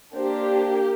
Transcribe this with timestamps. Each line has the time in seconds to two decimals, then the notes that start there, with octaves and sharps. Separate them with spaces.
0.15 A#3 D4 G4 C5